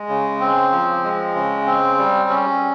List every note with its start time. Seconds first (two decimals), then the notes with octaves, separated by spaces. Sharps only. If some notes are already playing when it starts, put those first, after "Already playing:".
Already playing: G#3
0.08 C#3
0.40 C4
0.72 F3
1.04 G#3
1.35 C#3
1.67 C4
1.99 G3
2.30 C#4